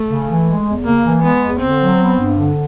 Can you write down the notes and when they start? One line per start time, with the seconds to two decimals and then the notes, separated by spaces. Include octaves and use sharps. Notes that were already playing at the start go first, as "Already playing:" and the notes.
Already playing: A3
0.09 C#3
0.28 E3
0.47 G#3
0.67 E2
0.85 C#3 A#3
1.05 E3
1.23 G#3 B3
1.43 E2
1.61 D3 C4
1.81 F#3
2.00 B3
2.19 G2
2.37 D3